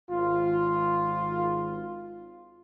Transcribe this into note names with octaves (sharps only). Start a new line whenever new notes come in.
G#1 F4